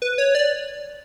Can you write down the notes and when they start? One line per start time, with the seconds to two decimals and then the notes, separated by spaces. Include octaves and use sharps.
0.02 B4
0.18 C#5
0.35 D5